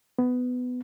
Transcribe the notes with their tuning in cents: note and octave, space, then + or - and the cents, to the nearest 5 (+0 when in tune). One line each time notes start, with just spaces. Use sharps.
B3 +15